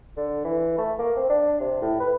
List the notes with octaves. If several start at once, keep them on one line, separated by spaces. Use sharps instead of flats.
D3
E3
A3
A#3
C4
D4
C3
A2
B4